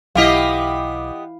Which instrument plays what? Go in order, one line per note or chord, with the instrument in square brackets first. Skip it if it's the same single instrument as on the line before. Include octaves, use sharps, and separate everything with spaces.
[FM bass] B1 [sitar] B3 G4 D#5 [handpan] E4 F5